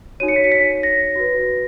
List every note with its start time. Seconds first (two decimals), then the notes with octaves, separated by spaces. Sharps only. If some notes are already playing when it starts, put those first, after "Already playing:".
0.20 D#4 F#4 C#5 D#7
0.28 C#7
0.36 B6
0.44 C#7
0.52 B6
0.83 A#6
1.15 F#4 B4